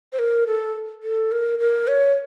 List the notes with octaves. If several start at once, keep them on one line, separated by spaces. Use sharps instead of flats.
C5
A#4
A4
A4
A#4
A#4
C#5